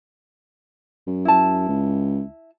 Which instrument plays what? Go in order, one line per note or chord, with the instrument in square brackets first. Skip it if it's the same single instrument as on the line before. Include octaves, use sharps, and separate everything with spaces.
[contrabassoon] F#2
[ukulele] E4 A5
[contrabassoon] C#2